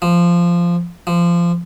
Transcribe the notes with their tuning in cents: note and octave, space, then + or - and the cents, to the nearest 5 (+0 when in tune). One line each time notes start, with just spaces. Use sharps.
F3 -10
F3 -20